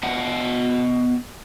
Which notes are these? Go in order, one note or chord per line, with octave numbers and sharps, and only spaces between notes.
B3 D#5 F#5 G5